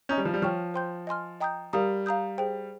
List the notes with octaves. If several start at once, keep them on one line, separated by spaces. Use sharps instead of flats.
C#4 D#5 A#5 D#6 G6
G3
F3
G3
F3 C#5 G5 C#6 F6
C5 G5 C6 G6
D#5 G#5 C6 F6
D#5 G5 A#5 D#6 G6
G3 G4 A#4 F5 A#5 D#6
F5 A#5 D#6 G6
G#4 C5 G5